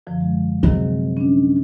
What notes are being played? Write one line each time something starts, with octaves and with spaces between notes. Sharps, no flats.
F#2 D3 F3
G#3
C3 D#3 F#3 C4 G#4
C#4 D4